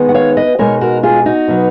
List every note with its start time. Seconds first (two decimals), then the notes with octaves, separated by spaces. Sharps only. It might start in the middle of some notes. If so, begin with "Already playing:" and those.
Already playing: D#3 G#3 B3 D#4
0.09 F#5
0.14 C#5 F5
0.37 B4 D#5
0.59 B2 G#3 D#4 A#4 C#5
0.81 F#4 A#4
1.03 F4 G#4
1.26 D#4 F#4
1.48 B2 F#3 B3